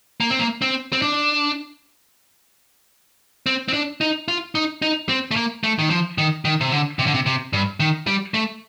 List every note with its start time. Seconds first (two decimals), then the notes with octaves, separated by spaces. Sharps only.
0.20 A#3
0.30 C4
0.39 A#3
0.62 C4
0.93 C4
1.02 D4
3.46 C4
3.68 C4
3.73 D4
4.01 D#4
4.28 F4
4.55 D#4
4.82 D#4
5.09 C4
5.31 A3
5.36 A#3
5.64 A3
5.79 D#3
5.90 F3
6.18 D#3
6.45 D#3
6.61 C3
6.72 D3
6.99 C3
7.07 D3
7.14 C3
7.26 C3
7.53 G2
7.80 D#3
8.07 G3
8.34 A3